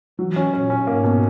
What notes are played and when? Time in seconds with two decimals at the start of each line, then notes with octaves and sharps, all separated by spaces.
0.19 E3 F#3
0.36 C#4
0.53 A#2 C#4
0.70 C#4
0.87 G#2 A#3
1.03 B2